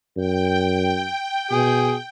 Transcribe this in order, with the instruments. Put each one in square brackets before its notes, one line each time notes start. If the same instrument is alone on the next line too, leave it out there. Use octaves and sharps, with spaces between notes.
[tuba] F#2 [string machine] G5
[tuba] B2 [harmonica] G#4